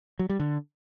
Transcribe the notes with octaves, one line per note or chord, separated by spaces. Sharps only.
F#3
G3
D3